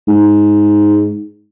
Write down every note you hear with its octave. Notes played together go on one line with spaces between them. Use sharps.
G#2